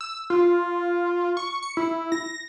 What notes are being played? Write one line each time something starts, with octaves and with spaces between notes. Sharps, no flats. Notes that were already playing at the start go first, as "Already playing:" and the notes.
E6
F4
C#6
C#7
E4
A#6